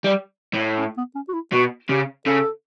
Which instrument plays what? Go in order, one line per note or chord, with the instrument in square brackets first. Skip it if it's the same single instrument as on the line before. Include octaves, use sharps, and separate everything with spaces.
[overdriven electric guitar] G3
A2
[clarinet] C#4
B3
C#4
F#4
E4
[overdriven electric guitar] B2 [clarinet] F#4
[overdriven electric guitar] C#3 [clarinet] G4
[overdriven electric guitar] C#3 [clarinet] A4